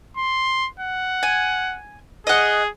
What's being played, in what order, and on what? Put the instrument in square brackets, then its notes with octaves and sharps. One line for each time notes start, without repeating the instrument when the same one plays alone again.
[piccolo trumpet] C6
F#5
[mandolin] G#5
[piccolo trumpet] G#4 [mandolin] D#5 F#5